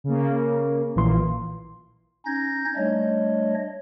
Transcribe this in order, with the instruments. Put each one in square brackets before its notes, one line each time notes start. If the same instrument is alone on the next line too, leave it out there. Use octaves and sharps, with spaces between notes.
[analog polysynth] C#3 A#3
[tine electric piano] A#1 E3 C6 [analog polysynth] A#2
[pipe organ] C#4 D#4 G6 G#6 A#6
G3 A3 D4 C#5 D#5